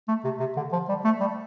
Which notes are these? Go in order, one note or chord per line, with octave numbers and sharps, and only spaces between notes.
A3
C3
C3
D3
F3
G3
A3
G3